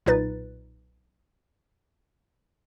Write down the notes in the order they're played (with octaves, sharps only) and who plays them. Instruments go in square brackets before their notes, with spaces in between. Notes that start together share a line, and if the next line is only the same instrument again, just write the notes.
[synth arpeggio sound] B1 A#2 D#4 B4 A6